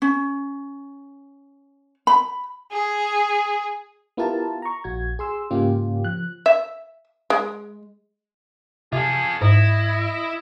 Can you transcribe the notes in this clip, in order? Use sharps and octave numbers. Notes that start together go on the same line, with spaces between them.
C#4
B5
G#4
B3 E4 F4 G4 A#4 A5
A#5 C#6
A#1 F#4 G#6
G#4 C6 E6
G#2 C#3 A#3 C#4 F4 G4
F3 F#6
E5
G#3
C3 F4 G#4 A4
G#2 E4 D#5